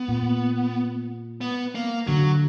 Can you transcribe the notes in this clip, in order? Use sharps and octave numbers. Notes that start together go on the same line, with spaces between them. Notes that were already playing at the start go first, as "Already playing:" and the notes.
Already playing: B3
A#2
B3
A#3
D3 F#3